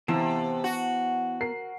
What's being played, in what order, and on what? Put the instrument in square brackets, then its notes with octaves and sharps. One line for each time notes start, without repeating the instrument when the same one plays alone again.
[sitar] C3 [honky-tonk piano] E3 [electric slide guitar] B3 F5 A5
[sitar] F#4
[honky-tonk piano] A#4 C7